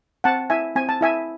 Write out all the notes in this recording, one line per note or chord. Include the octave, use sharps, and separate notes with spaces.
C4 F#5 A5
E4 E5 G#5
C4 G#5
A5
E4 E5 G#5